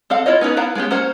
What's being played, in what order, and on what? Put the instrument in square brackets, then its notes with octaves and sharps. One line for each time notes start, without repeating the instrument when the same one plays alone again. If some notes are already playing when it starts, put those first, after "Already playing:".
[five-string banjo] C4 A4 F5 F#5
E4 F4 C#5 D#5
B3 C#4 D#4 B4
B3 E4 F5 F#5 A#5
G#3 B3 C#4 G4
A#3 C#4 C5 F#5